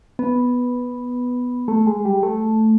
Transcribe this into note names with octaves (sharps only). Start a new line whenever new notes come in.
B3
A3
G#3
G3
A3